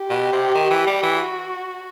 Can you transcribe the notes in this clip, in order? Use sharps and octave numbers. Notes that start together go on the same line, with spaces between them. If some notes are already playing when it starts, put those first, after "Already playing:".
Already playing: G4
B2
C3
D#3
E3
G3
E3
F#4